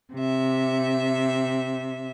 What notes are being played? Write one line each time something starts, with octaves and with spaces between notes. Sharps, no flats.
C3 E5